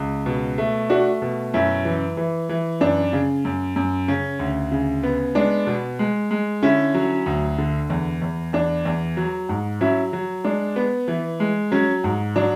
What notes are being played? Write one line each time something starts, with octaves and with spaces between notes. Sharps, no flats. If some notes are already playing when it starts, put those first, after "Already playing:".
Already playing: C#2
B2
A3
A3 D4 F#4
B2
F#2 C#4 E4
E3
E3
E3
F#2 D4
C#3
F#2
F#2
C#3 C#4
D2
C#3
B3
G#3 D4
B2
G#3
G#3
D3 C#4 E4
F#3
D2
D3
E2
E2
E2 D4
E2
F#3
G#2
F#3 C#4 E4
F#3
G#3 D4
B3
E3
G#3
F#3 C#4
G#2
F#3 D4